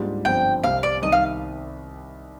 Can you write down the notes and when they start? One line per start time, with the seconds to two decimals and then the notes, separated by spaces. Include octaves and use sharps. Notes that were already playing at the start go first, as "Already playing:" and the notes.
Already playing: G#2 G3 A#3 D4 F4
0.24 G1 G2 F3 C4 G5
0.64 C2 C3 G3 C4 F5
0.83 D5
1.02 C2 C3 D#3 D#5
1.12 F5